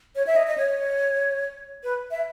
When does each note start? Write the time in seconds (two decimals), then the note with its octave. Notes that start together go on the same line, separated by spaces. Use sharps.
0.16 C#5
0.27 E5
0.36 D#5
0.47 D#5
0.58 C#5
1.83 B4
2.11 E5